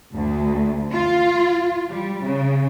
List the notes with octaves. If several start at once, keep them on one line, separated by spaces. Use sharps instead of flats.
D2
F4
G3
C#3